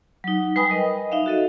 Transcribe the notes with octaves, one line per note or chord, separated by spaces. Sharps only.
F#3 D#4
G3 B4 G5 G#5 B5 D#6
A#4 D#5
D#4 E5 F5
F#4 A4 D#5